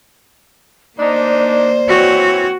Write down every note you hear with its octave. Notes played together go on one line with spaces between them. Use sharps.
A#3 D4 D#4 C5 D5
E3 C4 F#4 C#5